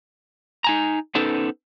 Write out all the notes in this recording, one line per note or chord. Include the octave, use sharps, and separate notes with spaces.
D#4 G#5 A#5
B3 C#4 D#4 A4 B4 C5